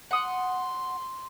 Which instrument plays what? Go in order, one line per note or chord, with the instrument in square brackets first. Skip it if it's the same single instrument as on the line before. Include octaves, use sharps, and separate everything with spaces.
[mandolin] F#5 D#6 [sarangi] C6